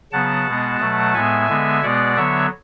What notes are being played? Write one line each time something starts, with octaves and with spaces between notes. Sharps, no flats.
C#3 F#3 B3 F#5 A5
B2 G#3 B3
B2 F#3 A3
A2 G#3 B3 E5 G#5
D3 G#3 B3
B2 G#3 B3 D5 F#5
D3 F#3 B3 C#5 E5